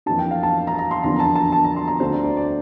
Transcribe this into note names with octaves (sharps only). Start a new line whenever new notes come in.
F2 E3 A#3 D4 A5
G5
F5
A5
A#5
A#5
C6
E2 D3 F3 A#3 D4 A#5
A5
A5
A5
A#5
C6
A#5
D2 D3 A3 C4 C5
D5
D5
D5